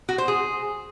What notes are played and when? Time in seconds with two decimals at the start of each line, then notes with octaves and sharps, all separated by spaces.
0.09 F#4
0.18 C5
0.28 G#4